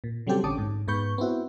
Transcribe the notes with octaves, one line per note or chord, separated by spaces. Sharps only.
A#2
C#3 F#3 G3 C4 G4 A4
A#1 D3 C#4 A5 D6 D#6
G#2
G#2 B3 B4 C#6 G6
B3 C4 E4 F#4